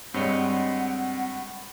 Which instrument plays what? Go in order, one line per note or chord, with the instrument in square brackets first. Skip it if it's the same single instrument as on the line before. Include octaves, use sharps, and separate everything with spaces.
[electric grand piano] G2 G3 G#3 [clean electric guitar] C4 C#5 D#5 [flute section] F#5